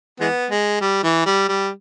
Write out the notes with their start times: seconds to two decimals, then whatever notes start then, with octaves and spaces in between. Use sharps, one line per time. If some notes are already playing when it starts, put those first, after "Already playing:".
0.20 E3 G#3 B3
0.50 G#3
0.81 G3
1.03 E3
1.26 G3
1.49 G3